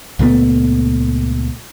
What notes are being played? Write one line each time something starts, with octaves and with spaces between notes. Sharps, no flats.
C#2 A#2 A3 B3